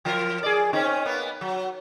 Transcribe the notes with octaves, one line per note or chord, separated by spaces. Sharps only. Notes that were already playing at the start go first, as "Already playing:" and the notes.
F3 F4 A#4
G#4 D5
C4 C#4 D#4
A#3 B3
F#3